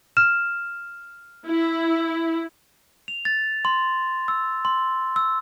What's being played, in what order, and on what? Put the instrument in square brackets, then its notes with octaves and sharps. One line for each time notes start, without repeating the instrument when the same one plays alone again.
[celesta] F6 E7
[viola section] E4
[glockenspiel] F7
A6
C6
E6
C6
E6